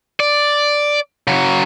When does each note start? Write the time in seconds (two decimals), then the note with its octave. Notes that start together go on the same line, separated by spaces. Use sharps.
0.20 D5
1.27 C#3 F#3